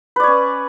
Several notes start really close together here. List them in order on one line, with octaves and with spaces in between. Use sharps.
B4 D5 C#5 C#4